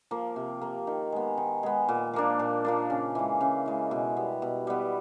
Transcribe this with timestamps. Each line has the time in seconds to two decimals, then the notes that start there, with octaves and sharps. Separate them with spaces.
0.11 F3 A#3
0.36 C3
0.62 F3 A#3
0.87 D#3
1.12 G#3 B3
1.37 D#3
1.63 G#3 B3
1.89 A#2
2.14 F3 A#3 D4
2.39 A#2
2.65 F3 A#3 D4
2.90 C#3
3.15 E3 G#3
3.41 C#3
3.66 E3 G#3
3.91 B2
4.17 G3 B3
4.42 B2
4.67 G3 B3